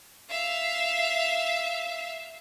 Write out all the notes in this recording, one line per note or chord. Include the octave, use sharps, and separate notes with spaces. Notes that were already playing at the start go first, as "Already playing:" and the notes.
E5 F5